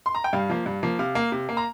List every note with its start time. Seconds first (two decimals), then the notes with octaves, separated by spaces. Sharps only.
0.06 C6
0.15 A#5
0.24 G5
0.33 G2 F5
0.50 F3 A#3
0.66 G2
0.83 F3 A#3
0.99 C3 F5
1.15 A#3
1.32 C3
1.49 A#3
1.57 A#5